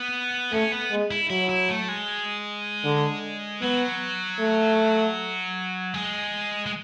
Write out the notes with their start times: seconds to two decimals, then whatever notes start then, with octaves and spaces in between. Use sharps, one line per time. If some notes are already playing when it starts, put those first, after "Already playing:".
Already playing: B3
0.52 A3 C#4
0.72 B3
0.91 G#3
1.11 E4
1.30 F#3 E4
1.49 E4
1.69 A3
1.88 G#3
2.84 D3
3.62 F#3 B3
4.39 A3
5.94 G#3
6.66 G#3